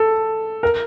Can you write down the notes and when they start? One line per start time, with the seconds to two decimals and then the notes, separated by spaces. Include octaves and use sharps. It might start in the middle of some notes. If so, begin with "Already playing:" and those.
Already playing: A4
0.63 A#4